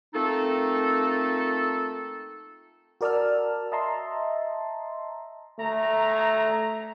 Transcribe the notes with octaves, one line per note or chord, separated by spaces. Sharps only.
A3 A#3 C4 D#4 F4 A4
F#4 A#4 D5 A5 E6 F6
D#5 E5 A5 A#5 C6
A3 A#5